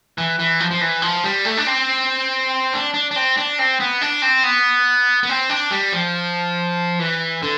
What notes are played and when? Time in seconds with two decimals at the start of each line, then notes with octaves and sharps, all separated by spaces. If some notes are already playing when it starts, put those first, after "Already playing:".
0.18 E3
0.39 E3
0.60 F3
0.71 F3
0.81 E3
1.02 F3
1.24 G3
1.45 A3
1.57 D4
1.67 C4
2.73 D4
2.94 D4
3.11 D4
3.16 C4
3.37 D4
3.59 C4
3.80 B3
4.01 D4
4.22 C4
4.43 B3
5.23 B3
5.29 C4
5.50 D4
5.71 G3
5.92 F3
6.99 E3
7.43 D3